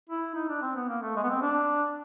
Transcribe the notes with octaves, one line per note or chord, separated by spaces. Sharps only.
E4
D#4
D4
C4
B3
A#3
A3
G#3
B3
C4
D4